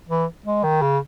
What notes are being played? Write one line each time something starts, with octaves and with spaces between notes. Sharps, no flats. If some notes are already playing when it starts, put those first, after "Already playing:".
E3
G#3
D#3
C#3